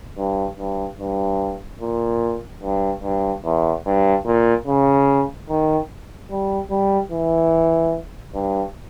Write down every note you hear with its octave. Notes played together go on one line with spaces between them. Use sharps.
G2
G2
G2
A#2
G2
G2
E2
G2
A#2
C#3
D#3
G3
G3
E3
G2